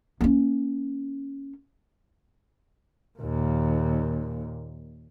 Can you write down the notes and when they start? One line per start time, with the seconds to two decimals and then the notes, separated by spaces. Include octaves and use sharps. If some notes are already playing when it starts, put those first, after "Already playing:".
0.21 A#3 C#4
3.19 D#2 A#2